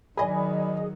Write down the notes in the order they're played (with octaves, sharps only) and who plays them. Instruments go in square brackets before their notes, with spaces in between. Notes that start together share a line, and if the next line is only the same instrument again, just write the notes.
[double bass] D#3 F#3 [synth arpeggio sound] G#4 D#5 [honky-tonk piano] D5 G#5 B5